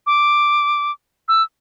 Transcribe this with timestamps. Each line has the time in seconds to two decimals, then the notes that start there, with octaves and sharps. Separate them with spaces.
0.07 D6
1.28 E6